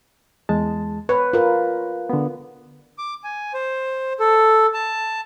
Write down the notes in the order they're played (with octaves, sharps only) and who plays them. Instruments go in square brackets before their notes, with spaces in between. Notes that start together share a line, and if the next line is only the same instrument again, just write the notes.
[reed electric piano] E2 G#3 A5
[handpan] B4 [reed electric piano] C#5
[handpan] F4 A#4
[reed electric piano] D3 B3
[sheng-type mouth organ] D6
G#5
C5
A4
A5